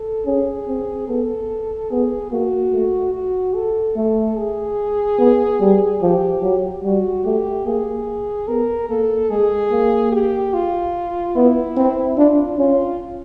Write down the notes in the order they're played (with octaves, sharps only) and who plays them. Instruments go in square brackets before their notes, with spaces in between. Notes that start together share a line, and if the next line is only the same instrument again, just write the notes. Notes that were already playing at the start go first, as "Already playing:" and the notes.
Already playing: [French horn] A4
[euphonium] C#4 [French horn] G#4
[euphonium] C4
[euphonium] B3 [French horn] A4
[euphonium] B3 [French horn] G#4
[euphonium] A#3 [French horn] F#4
[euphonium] A3
[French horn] F#4
A4
[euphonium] A3
[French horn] G#4
[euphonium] B3
G3
[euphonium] F3 [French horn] G4
[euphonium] F#3
[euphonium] G3 [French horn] F#4
[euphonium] A3 [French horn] G4
[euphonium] A#3 [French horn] G#4
[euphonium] B3 [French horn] A#4
[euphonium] A#3 [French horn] A4
[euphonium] G#3 [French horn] G#4
[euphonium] A#3
[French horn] G4
F4
[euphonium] B3 [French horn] E4
[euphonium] C4
[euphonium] D4 [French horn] F4
[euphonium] C#4 [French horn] F4